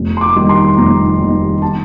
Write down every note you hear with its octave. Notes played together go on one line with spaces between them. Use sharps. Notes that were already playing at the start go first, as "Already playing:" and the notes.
Already playing: F1
C6
D6
D#2 D#3 G3
C6
F1 A#5
D#2 D#3 G3
A5